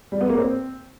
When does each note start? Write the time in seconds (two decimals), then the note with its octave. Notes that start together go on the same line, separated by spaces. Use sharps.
0.12 G3
0.21 B3
0.29 A#3
0.38 C4